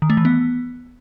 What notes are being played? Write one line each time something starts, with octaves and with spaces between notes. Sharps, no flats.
D#3
A3
E3
B3